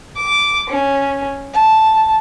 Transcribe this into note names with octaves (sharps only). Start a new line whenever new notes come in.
D6
C#4
A5